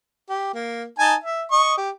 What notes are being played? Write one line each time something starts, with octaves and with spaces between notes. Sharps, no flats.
G4
A#3
D#4 G#5 A5
E5
D#5 C#6
G4